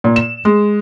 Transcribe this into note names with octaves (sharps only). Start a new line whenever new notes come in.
A#2
E7
G#3